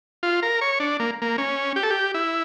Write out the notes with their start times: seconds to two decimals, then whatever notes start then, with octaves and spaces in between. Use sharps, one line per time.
0.23 F4
0.43 A#4
0.61 C#5
0.80 D4
1.00 A#3
1.22 A#3
1.38 C#4
1.76 G4
1.83 A4
1.90 G4
2.14 E4